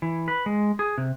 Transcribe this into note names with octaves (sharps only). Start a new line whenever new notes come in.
E3
B4
G#3
G#4
C3